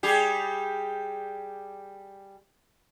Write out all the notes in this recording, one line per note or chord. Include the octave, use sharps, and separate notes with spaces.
G3 G4 G#4